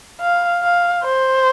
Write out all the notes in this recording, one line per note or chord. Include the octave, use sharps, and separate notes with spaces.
F5
F5
C5